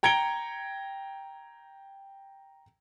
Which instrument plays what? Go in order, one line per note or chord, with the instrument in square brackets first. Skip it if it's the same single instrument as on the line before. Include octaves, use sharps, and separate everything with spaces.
[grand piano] G5 A#5 G#6 C#7 D7 G7